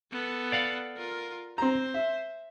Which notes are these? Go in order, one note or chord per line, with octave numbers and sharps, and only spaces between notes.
B3 A4
D5 F5 F#5
F4 A#4
C4 C5 A#5
E5